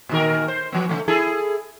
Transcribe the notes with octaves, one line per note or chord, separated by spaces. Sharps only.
A#2 D#3 A#4
C5
F3 B3
C#3 E3 A3
E4 G#4 A4